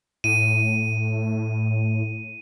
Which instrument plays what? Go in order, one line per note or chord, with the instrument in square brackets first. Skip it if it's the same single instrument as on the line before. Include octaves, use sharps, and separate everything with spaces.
[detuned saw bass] A2 [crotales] D#7